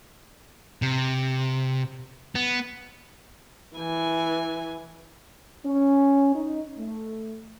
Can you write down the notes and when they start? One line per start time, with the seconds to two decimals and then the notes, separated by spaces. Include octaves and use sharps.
0.82 C3
2.35 B3
3.77 E3 G#5
5.66 C#4
6.35 D#4
6.79 A3